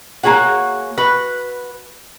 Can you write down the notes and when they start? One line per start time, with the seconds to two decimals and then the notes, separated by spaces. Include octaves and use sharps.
0.23 A#3 F#4 G#4 C#5 F#5
0.98 F#4 B4